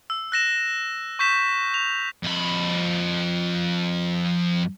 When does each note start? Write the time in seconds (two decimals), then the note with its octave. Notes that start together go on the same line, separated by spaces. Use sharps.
0.10 E6
0.32 F#6 A#6 E7
1.19 C#6 G6 B6 E7
1.74 F7
2.24 F2 B5